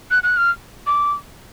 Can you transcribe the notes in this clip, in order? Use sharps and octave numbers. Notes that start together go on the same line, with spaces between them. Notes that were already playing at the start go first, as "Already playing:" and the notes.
F#6
F#6
F6
D6